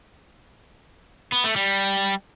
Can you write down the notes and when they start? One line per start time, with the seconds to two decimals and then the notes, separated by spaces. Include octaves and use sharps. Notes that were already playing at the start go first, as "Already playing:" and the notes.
1.32 B3
1.44 A3
1.56 G3